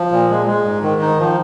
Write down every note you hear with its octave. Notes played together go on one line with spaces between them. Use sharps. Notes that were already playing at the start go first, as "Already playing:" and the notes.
Already playing: F3
A#2
G#3
G#3
G#2
D#3
D#4
F3